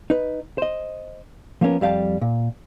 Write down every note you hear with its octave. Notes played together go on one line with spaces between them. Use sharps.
D#4 B4
C5 D#5
F3 A#3 B3 C#4 A#4
F2 G3 F5 G5 A5
A#2